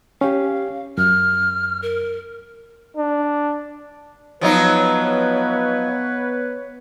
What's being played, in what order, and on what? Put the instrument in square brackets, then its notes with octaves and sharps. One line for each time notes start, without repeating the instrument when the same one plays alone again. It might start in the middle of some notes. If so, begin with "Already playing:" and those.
[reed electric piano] C#4 G4 [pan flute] F5
[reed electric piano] F#2 [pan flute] F6
[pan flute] A#4
[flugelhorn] D4
[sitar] F3 F#3 D#4 [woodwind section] B3 B4 C#5